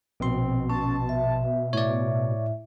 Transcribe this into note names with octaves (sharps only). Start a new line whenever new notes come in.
A#1 B2 C4 C6
C#4 A5
E5
A2 C#5 D5